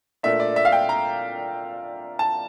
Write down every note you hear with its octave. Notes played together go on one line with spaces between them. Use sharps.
A#2 A3 D4 E5
D5
E5
F5
G5
A#5
A5